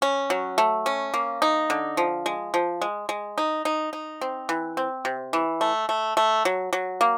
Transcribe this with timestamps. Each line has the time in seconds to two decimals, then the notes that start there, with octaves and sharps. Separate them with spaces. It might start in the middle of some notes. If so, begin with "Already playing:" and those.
0.02 C#4
0.30 F#3
0.58 A3
0.86 C#4
1.14 A#3
1.42 D#4
1.70 D3
1.97 F3
2.26 G#3
2.54 F3
2.82 G#3
3.09 G#3
3.38 D#4
3.65 D#4
3.93 D#4
4.21 C4
4.49 E3
4.77 C4
5.05 C3
5.33 E3
5.61 A3
5.89 A3
6.17 A3
6.45 F#3
6.73 F#3
7.01 A#3